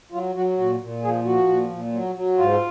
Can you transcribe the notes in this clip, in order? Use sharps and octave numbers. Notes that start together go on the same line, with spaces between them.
F#3 F4
F#3 F#4
A#2 F#4
A#2
F3 G#4
F3 F#4
A#2
A#2
F#3
F#3
G#2 F4